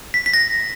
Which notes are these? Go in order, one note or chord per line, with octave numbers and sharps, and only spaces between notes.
B6
B6
A#6